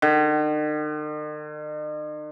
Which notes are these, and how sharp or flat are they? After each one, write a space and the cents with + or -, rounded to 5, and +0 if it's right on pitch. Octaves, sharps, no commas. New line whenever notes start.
D#3 -45